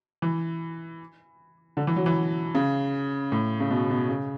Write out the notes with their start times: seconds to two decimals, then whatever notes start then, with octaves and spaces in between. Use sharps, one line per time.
0.22 E3
1.77 D3
1.87 E3
1.96 F#3
2.06 E3
2.55 C#3
3.32 A2
3.60 C#3
3.71 B2
3.90 B2
4.09 C#3